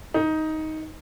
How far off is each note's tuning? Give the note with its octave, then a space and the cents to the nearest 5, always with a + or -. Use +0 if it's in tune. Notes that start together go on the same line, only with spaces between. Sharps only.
D#4 +10